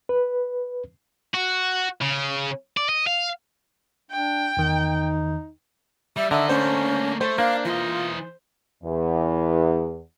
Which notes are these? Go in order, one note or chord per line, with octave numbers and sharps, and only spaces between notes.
B4
F#4
C#3
D5
D#5
F5
D4 G5
E2 D#3 D#4
G3 E5
D3 A#4 D#5 E5
A3 A#3 C#4 C5
A3 C5
A#3 D4 F5
E3 F4 D#5
E2